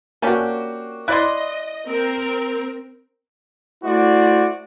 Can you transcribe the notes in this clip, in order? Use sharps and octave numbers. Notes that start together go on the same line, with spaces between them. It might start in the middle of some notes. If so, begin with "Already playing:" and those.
A#3 C#4 D4 F#4 G4
E4 D5 D#5 C6 F#6
C4 A#4
A3 E4 F#4 C5 D5